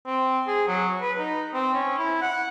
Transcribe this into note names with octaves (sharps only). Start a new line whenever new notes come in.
C4
G#4
F#3
B4
D#4
C4
C#4
E4
F#5